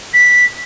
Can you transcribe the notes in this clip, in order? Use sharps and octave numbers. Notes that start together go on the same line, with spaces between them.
B6